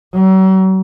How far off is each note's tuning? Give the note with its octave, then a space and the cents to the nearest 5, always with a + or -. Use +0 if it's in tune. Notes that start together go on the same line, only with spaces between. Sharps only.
F#3 +40